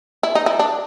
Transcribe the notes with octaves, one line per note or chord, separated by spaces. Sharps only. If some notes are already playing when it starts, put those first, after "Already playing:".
E4
D#4
E4
D4